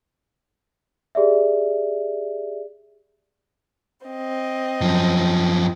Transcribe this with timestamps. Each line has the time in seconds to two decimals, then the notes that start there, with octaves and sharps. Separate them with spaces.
1.15 G4 G#4 D5 E5
4.05 C4 D#5
4.81 F#2 F3